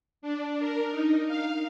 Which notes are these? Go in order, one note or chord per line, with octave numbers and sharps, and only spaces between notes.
D4
A#4
D#4
F5